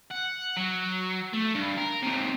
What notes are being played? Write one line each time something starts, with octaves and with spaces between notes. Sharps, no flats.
F#5
F#3
A3
G2
A#4
D#2 C3